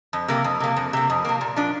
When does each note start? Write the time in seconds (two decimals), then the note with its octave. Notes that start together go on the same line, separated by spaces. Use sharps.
0.13 F2
0.28 C3 A#3
0.44 F2
0.60 C3 A#3
0.76 F2
0.93 C3 A#3
1.10 F2
1.25 C3 A#3
1.41 A#2
1.56 F3 D4